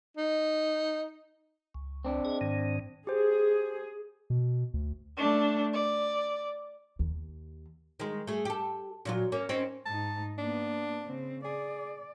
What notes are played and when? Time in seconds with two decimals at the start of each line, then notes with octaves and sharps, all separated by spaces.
0.17 D#4
1.75 C#2
2.05 C4 D4
2.25 G#4 D#5
2.41 G#2 D#3
3.07 G4 G#4 C5
4.30 B2
4.74 D2
5.17 A3 D4
5.73 D5
6.99 D#2
8.00 D#3 G#3
8.27 A3 G#4
8.45 G4 A4
9.05 A#2 F#3 F4
9.32 A#3 C#4
9.49 C4 C#4 D#4
9.86 G#2 D#4 A5
10.38 A#3 B3 D4
11.05 C#3 C4
11.45 G#4 D5